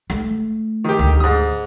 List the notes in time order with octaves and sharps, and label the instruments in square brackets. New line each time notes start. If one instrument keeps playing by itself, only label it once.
[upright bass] A3
[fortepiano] D#3 G4
[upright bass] D2
[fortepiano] G#2 D#6